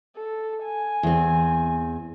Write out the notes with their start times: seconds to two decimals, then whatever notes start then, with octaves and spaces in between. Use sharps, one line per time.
0.16 A4
0.64 G#5
1.03 E2 C4